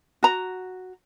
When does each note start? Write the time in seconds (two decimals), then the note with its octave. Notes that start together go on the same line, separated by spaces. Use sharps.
0.23 F#4 A#5